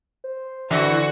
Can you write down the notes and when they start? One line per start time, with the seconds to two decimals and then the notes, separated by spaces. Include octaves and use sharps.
0.24 C5
0.71 D3 E3 F#4